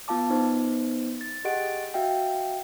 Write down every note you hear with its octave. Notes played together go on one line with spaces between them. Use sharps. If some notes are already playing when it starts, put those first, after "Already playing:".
B3 F4 F5 A5 D6
B3 D#4 C5
A6
G4 G#4 D#5 F#5 A6 D7
F#4 E5 F5 G5